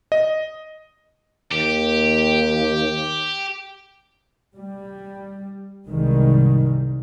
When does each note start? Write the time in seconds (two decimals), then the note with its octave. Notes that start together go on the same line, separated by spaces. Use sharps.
0.12 D#5
1.52 D#2 G4
4.56 G3
5.86 C2 G#2 D#3 G3